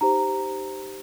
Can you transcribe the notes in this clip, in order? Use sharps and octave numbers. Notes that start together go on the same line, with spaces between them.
D#4 G4 C5 A#5